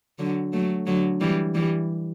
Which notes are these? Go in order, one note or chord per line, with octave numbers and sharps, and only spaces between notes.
D3 F#3
F#3 A3
D3 F#3
E3 G3
E3 G3